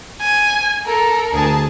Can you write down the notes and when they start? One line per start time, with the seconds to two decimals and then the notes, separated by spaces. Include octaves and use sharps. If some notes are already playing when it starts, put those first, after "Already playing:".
0.21 G#5
0.86 A4 A#4
1.32 D2 G#4 A5